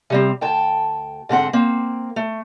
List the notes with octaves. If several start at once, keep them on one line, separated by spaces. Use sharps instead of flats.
C3 G3 C4
D2 G5 A5
G#2 D3 C4 F#5
A#3 C4
A3